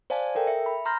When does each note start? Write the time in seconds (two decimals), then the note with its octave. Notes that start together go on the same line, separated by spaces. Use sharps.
0.10 C5 D5 F5 G#5 A5
0.35 A4 A#4 G5
0.47 E5 C#7
0.66 B5
0.85 A#5 C6 F6 G6 A#6